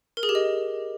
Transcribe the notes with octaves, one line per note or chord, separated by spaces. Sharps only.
A#4
G#4
G4
D#5